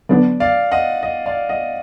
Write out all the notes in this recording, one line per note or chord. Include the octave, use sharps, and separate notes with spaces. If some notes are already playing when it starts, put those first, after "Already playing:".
D3 F#3 B3 D4 D5
D5 F5
D#5 F#5
D#5
D5 F5
D#5 F#5